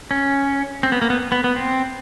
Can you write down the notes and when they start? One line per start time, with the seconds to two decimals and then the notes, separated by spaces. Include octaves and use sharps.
0.11 C#4
0.83 C4
0.92 B3
1.02 A#3
1.10 B3
1.32 B3
1.44 B3
1.56 C4